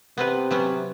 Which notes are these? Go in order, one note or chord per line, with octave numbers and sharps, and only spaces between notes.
C3 B3 C4 B4
F#3 B3 C#4